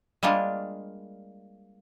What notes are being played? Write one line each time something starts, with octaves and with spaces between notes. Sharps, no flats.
G3 G#3 A#3 D4 F4